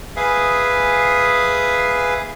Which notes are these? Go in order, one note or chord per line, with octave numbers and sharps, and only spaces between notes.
G#4 B4 E5 F5 G#5 D#6